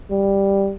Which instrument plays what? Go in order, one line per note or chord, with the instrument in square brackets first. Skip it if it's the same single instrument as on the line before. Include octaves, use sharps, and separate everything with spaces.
[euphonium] G3